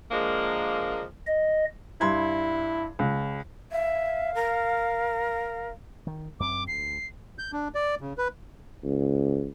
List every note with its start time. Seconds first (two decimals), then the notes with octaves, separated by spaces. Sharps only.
0.11 D3 F3 G#3 A#3
1.27 D#5
2.01 G2 E4 C6 G#6
2.99 C#2
3.72 E5 F5
4.35 A#4
6.07 D#3
6.40 F#2 C4 D6
6.68 D2 C7
7.38 G6
7.53 D4
7.75 D5
8.01 C#3
8.18 B4
8.84 C#2